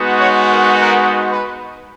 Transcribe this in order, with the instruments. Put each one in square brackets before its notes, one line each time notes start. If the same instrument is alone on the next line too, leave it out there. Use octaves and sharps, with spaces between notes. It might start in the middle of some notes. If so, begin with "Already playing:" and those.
Already playing: [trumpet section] G#3 B3 D#4 F#4
C#5
A#4
A#4
B4